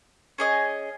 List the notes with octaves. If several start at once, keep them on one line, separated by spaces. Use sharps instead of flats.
C#4 G#4 D#5